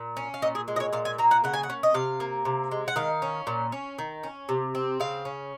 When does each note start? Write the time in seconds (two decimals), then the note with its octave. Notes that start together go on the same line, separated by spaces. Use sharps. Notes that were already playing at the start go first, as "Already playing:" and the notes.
Already playing: A#2
0.17 C#4
0.34 F5
0.42 A#2 D#5
0.55 G#4
0.68 G#3
0.76 D#5
0.80 C#5
0.93 A#2 F5
1.05 G#5
1.18 A#3 A#5
1.31 F#5
1.44 C#3 F#5
1.54 G#5
1.63 F#5
1.70 C#4
1.83 D#5
1.94 C3 F5
2.20 A#3
2.45 C3
2.71 G#3
2.88 F#5
2.96 D#3 F5
3.22 C#4
3.47 A#2
3.72 C#4
3.99 D#3
4.23 C#4
4.49 C3
4.75 C4
5.00 C#3 F5
5.25 C#4